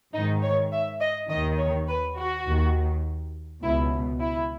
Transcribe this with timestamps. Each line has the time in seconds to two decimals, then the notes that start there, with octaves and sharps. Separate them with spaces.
0.13 G#2 D#3 D#4
0.42 C#5
0.72 E5
1.01 D#5
1.30 D#2 D#3 D#5
1.58 C#5
1.88 B4
2.18 F#4
2.46 D#2 D#3
3.63 C#2 B2 E4
4.21 E4